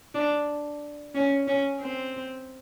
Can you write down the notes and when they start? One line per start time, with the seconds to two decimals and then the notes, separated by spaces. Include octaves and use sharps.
0.15 D4
1.15 C#4
1.47 C#4
1.81 C4